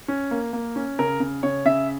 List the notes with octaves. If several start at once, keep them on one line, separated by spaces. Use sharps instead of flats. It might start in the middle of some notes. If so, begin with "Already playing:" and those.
C#4
A#3
A#3
C#4
C#3 A#4
C#3
C#3 C#5
C#3 E5